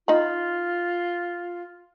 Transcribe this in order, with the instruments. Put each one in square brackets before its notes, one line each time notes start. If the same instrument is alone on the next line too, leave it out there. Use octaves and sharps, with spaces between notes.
[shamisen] D#4 B5 [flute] F4